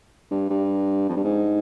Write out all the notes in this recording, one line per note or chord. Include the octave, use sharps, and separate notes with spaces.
G2
G2
F2
G2
G#2